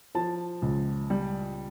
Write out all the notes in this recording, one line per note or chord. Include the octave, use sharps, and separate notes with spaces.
F3 A5
C#2
G3